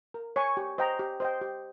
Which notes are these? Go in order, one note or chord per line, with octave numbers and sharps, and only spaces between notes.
A#4
C#5 G#5 C#6
G4
C5 D#5 G5 A#5
G4
C5 D#5 G5
G4